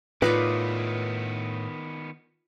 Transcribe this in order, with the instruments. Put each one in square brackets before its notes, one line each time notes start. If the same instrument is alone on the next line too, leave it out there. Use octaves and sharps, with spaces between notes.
[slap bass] A2 [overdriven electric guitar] D#3 B3 [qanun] D#4 F4 D5 [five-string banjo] B4